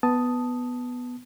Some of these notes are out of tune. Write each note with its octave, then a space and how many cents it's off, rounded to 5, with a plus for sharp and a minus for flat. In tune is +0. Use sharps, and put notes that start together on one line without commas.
B3 +0 A5 +0 D#6 +0